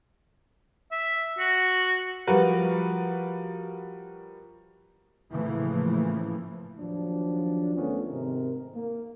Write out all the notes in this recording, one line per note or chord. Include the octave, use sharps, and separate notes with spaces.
E5
F#4
F3 G3 F#4 A#4 B4
A2 C#3 E3 F3 A3 A#3
D#2 F3 F#3 D4
D#3 F3 A3 B3 C#4
G#2 C3 D#3 A#4
A#3